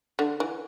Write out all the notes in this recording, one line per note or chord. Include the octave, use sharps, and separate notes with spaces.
D3
E3